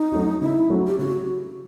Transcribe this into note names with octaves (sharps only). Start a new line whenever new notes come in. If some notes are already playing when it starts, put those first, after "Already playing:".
Already playing: D#4
F#3 A3 C#4 F#4
C#3 E4
F#3 A3 C#4 F#4
G4
C#3 F#4